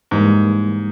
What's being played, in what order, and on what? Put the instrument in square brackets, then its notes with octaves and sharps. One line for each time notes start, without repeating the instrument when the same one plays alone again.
[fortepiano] G#2 [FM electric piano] E3 G3 A#3